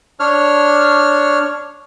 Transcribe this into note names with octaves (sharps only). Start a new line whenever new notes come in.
D4 C#5 F6